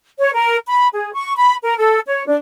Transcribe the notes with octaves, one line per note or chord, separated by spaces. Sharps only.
C#5
A#4
B5
G#4
C#6
B5
A#4
A4
C#5
D4